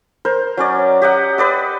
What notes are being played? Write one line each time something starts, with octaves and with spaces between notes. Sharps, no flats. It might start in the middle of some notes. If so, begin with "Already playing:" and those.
A#4 C5
F#3 C#4 D5
G4 D#5 F#5
B4 D5 D#5